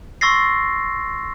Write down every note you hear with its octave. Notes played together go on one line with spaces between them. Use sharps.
C6 C#6 E6 A6 A#6 C7